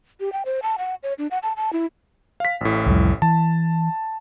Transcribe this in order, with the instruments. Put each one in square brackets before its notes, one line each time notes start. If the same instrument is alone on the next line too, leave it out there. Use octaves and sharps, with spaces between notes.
[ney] G4
G5
C5
A5
F#5
C#5
D4
F#5
A5
A5
E4
[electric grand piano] F5 B6
A1 A2
[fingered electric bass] C2 F2 G3
[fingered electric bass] E3 [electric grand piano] A5